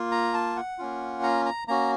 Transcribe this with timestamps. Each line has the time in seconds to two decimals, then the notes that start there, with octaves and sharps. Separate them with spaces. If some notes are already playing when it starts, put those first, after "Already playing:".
Already playing: A#3 F4
0.11 A#5
0.34 A5
0.56 F#5
0.78 A#3 C#4 F4
1.23 A#5
1.46 A#5
1.68 A#3 C#4 F#4 A#5